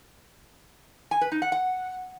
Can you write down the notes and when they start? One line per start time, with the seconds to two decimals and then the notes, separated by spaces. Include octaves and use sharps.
1.11 G#5
1.21 B4
1.32 D#4
1.42 F#5
1.52 F#5